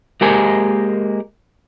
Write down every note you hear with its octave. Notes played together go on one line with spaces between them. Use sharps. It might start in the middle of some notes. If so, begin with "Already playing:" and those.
G#3 A#3 G4 A#4 C5 G#5